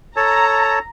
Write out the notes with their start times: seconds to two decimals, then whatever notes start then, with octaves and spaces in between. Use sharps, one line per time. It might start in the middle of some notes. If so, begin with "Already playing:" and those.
0.16 A4 C#5 A5 A#5